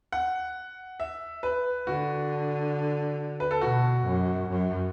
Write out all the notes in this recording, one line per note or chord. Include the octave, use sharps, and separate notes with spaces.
F#5
E5
B4
D3 F#4
B4
A4
B2 F#4
F#2
F#2